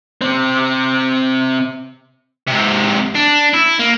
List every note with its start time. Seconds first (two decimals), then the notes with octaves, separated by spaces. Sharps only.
0.21 C3 C4
2.47 G#2 C3
3.15 D4
3.54 E4
3.79 A#3